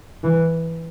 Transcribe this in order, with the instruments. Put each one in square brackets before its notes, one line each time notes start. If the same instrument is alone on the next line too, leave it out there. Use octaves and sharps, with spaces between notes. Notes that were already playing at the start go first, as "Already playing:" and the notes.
[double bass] E3